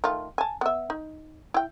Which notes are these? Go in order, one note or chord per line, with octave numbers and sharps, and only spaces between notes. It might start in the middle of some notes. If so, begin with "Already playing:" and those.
D#3 A3 F4
G#5 A5
B3 E5
D#4
E4 G5